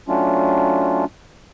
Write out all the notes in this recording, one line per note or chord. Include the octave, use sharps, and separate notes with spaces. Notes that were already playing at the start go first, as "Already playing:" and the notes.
F#3 A3 C#4 D4 F4